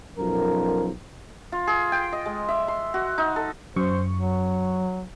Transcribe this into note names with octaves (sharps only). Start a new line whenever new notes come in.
B1 F#2 F3 A#4
F4
G#4
G5
D#5
G#3
E5
C6
F#4
D#4
A4
F#2 C5 C#6
F#3